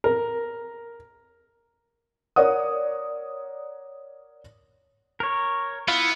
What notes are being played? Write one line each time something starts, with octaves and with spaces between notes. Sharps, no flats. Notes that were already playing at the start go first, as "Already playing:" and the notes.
A#4
A#4 C#5 D5 F#5 D#6
A#4 C#5
B3 E4 F4 F5